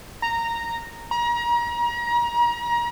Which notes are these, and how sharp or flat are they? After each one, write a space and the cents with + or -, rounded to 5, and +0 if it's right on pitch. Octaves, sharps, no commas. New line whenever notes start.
A#5 -10
A#5 +35